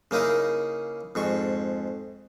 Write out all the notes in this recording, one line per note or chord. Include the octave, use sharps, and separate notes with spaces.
C#3 A#3 D#4 E4 G#4
F2 G#2 C#6